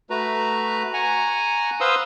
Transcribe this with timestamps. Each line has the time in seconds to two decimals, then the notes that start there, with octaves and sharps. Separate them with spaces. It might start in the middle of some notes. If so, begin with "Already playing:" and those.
0.10 A3 F#4 B4 A#5
0.94 F#5 G#5 A#5 C#6
1.81 B4 C5 F5 C6 D#6 E6